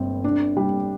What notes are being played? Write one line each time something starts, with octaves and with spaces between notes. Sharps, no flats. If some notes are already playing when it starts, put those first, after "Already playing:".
Already playing: G1 G2 C4
D4
G3